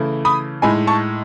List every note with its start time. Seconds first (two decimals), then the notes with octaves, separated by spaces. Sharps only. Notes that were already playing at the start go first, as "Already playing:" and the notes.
Already playing: C#3 E3 A3 E4
0.25 B5 D#6
0.62 A2 G#3 D#4 G#5 B5
0.87 A5 C#6